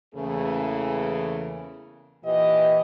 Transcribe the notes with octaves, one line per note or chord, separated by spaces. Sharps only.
E2 C#3 E3 A3 A#3 G#4
A#2 E3 G4 D#5